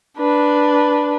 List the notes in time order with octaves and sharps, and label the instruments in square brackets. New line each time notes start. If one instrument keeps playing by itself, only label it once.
[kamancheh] D4 B4